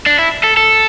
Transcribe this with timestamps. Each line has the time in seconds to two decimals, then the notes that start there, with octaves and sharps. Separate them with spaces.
0.06 D4
0.19 E4
0.44 A4
0.57 A4